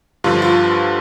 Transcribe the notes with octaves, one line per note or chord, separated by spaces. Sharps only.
G2 D3 F3 F4
F4